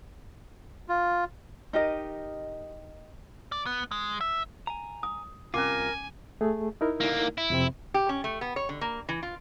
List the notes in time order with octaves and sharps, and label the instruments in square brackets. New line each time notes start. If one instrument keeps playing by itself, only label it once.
[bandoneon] F4
[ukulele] D#4 G4 A#4 D#5
[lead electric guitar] D5
B3
G#3
E5
[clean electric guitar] G#5 A#5
[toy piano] D#6
[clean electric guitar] C2 C3 F4 [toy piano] C#4 D6 [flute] A#4 [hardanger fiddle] G#5
[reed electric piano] A3 G#4
D#4 E4 A#4
[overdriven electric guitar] D3 A#3
E4
[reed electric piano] F2 C3 C4
[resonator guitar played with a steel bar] G4
C#4
A3
B3
C#5
D3
A#3
E3
F4